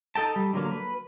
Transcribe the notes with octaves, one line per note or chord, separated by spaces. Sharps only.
D#4 A4 G5 A5
G3
D3 F#3 A#3
B4